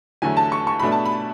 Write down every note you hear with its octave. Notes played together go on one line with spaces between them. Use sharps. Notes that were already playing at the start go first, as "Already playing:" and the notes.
E2 D3 F#3 A3 G#5
A5
C#6
C#6
B2 A3 D4 B5
A5
B5